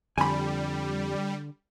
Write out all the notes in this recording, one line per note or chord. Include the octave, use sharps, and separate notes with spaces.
F2 D3 G3 G#5 B5